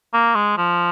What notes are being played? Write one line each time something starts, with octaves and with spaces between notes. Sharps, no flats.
A#3
G#3
F3